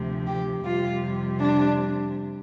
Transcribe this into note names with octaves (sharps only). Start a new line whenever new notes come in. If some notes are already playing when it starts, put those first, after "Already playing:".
Already playing: D2 C3 F3
G4
F2 C3 G3 F4
D4